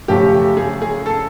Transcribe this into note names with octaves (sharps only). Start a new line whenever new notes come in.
F#2 C#3 F3 A3 G4
G#4
G#4
A4